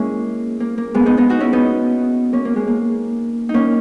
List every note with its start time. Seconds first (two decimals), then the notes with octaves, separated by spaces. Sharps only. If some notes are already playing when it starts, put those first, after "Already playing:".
Already playing: G#3 A#3 C#4 E4
0.60 A#3
0.78 A#3
0.94 G#3 B3
1.06 B3 D#4
1.17 B3 D#4
1.29 D#4 F#4
1.40 C#4 E4
1.53 B3 D#4
2.33 A#3 C#4
2.45 A#3
2.56 G#3
2.67 A#3
3.49 D#4
3.54 A#3 C#4